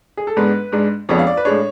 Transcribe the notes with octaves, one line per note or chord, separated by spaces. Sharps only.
G#4
A4
G#2 G#3 B3 D4 B4
G#2 G#3 D4
F2 F3 G#3 B3 D4 C#5
F5
D5
B4
A2 G#3 D4 C#5